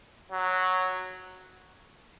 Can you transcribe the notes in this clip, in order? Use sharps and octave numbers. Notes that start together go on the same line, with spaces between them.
F#3